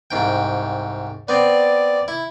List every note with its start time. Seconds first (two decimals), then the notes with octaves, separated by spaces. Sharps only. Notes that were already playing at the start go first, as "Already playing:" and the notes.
0.11 C2 G#2 G5
1.28 B3 C4 D5
2.08 E4